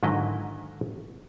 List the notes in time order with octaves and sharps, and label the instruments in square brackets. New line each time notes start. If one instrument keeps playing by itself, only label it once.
[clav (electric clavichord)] G#2 D3 D#3 F#3 E4 D#5